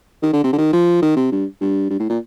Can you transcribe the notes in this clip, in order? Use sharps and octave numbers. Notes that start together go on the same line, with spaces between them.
D#3
D3
C3
D3
D#3
F3
D#3
C3
G2
G2
G2
A2
A#2